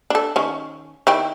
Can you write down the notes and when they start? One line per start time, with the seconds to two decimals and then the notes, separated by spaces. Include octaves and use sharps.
0.10 D4 A4
0.36 D#3 C#4
1.07 D#3 E4 G5